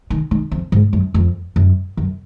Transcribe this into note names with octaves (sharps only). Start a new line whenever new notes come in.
D#3
D#3
F2
G#2
F#2
F2
F#2
F#2